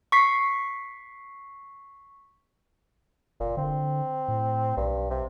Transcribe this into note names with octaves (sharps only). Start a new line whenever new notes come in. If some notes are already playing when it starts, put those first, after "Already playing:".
C#6 B6 C7
F#1 A#2
D3 C4
A2
B1 G2
C3